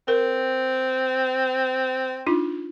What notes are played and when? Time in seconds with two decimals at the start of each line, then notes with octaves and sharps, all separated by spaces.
0.08 C4 A#4
2.27 D4 D#4 F4